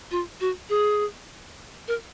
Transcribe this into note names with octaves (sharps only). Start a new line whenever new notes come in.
F4
F#4
G#4
A#4